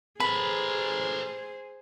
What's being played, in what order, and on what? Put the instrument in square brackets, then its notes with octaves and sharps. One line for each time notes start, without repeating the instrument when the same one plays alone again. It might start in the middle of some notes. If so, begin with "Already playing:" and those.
[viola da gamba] G#4 C5 [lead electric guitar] A4 B4 [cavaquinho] B5